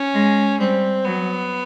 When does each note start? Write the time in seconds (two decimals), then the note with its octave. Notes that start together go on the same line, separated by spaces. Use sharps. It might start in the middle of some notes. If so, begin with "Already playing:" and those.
Already playing: C#4
0.14 G#3
0.59 G3 C4
1.04 F#3 B3